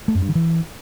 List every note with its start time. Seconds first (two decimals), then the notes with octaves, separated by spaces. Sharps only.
0.08 A3
0.15 F#2
0.22 G2
0.28 D#3
0.35 E3